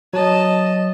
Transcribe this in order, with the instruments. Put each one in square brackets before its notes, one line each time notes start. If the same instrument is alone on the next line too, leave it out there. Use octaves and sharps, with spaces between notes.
[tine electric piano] F#3 [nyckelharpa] D#5 A5